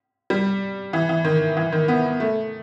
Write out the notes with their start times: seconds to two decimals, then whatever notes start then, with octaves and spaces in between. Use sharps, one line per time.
0.30 G3
0.93 E3
1.09 E3
1.24 D#3
1.57 E3
1.72 D#3
1.88 B3
2.20 A3